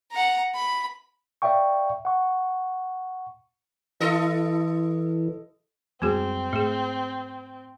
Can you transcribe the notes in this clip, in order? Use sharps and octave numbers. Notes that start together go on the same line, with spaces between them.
F#5 A#5
B5
D5 E5 F5 G5 C#6
F#5 C#6
E3 E4 A4 D#5
F#2 G3 G#3 B3 C4 F#4 G#4
G#2 A3 G#4